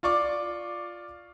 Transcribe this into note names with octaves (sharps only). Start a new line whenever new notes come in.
F4 D5 C#6 D6